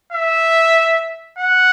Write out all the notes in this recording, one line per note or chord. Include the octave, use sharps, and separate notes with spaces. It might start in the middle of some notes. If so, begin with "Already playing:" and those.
E5
F#5